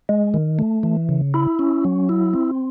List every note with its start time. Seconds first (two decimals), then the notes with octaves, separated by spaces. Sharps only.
0.09 G#3
0.34 D#3
0.59 A3
0.83 E3
1.09 C#3
1.34 E4
1.59 C#4
1.85 F#3
2.09 E4
2.34 C4